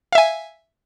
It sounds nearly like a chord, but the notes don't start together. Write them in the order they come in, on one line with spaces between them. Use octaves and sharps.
F5 E5 G#5